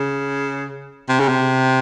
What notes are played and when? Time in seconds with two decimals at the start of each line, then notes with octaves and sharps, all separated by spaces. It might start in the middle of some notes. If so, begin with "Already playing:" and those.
Already playing: C#3
1.09 C3
1.20 C#3
1.28 C3